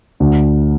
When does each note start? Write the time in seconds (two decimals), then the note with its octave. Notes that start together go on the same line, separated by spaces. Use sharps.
0.20 D2